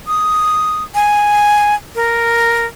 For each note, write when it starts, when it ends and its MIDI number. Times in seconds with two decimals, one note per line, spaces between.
0.07 0.83 87
0.95 1.75 80
1.95 2.66 70